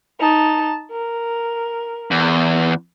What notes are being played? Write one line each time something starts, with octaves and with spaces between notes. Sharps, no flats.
D#4 A5
A#4
E2